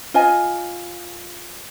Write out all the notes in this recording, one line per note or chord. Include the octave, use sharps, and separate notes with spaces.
F4 D#5 G#5